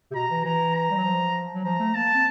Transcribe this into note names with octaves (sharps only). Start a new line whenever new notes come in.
C3
B2 A#5
E3
E3 A#5
A#5
G3
F#3
F3
F#3
F3 A#5
A3
A#3 A5
C4